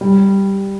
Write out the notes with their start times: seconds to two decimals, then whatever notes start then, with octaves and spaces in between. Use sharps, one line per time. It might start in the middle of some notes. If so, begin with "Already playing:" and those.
0.01 G3